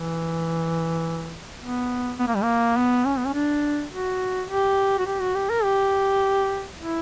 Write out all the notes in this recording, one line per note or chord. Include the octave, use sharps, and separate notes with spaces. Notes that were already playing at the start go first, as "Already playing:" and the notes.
Already playing: E3
B3
B3
A#3
G3
A#3
B3
C#4
B3
C#4
D4
F#4
G4
F#4
G4
F#4
G4
A#4
G4
E4